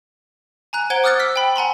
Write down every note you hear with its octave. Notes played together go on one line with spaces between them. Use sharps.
G#5 A#5 F#6
C5 F#5 G#6 D7 G7
D6 D#6 F6 F#6 A6 C#7
E6 B6
G5 B5
F#5 G#5 A#5 C6